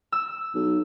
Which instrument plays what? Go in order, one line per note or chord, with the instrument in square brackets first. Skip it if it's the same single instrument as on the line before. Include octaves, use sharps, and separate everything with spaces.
[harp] E6
[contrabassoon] B1